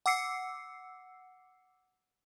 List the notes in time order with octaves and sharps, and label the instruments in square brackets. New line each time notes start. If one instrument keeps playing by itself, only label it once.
[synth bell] F#5 D6 E6 C7 C#7